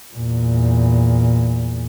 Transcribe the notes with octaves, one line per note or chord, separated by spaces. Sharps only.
E2 A#2